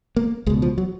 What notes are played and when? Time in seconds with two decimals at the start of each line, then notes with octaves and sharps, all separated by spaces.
0.16 A#3
0.47 C#2 G#3
0.50 B2
0.62 F3
0.78 F#3